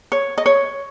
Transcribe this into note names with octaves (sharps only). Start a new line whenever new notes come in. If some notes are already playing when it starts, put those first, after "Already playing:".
C#5
D#5
C#5